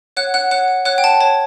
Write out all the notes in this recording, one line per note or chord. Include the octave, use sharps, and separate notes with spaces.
C#5 F#5 F#6
F#5 F#6
C#5 F#5 F#6
F#5
C#5 F#5 F#6
G5
F#5 A5
C#5 A5